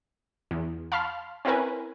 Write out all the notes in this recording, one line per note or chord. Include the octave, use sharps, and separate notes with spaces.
E2
F5 A5 B5 C6 F6
C4 C#4 E4 A#4 B4 G#5